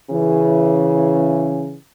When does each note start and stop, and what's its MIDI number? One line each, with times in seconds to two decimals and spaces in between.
0.10 1.74 49
0.10 1.74 52